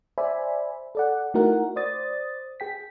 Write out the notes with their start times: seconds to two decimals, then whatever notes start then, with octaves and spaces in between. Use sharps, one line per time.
0.18 C5 D5 E5 G#5 B5
0.95 A4 D5 F#5
1.34 A3 D#4 E4 F#4 A#4 F#5
1.76 C5 D5 D#6 A6
2.60 G#4 G5 B6